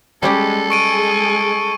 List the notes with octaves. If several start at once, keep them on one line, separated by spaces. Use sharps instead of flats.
G3 G#3 C#4 G4 A4
G#3 G#4 C#6 D7 D#7